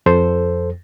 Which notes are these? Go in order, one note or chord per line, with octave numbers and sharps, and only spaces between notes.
F2 A4 C5